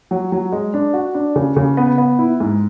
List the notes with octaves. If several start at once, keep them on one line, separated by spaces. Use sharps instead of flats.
F#3
F#3
G#3
D4
F#4
D4
C#3
C#3
B3
B3
E4
G#2